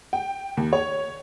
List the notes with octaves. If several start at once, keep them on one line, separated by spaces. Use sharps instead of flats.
G5
D#2
C#5